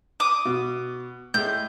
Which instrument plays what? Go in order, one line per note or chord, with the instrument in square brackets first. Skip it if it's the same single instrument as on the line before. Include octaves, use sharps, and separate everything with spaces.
[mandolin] D6 D#6
[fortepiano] B2
[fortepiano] A2 G#3 [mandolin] G6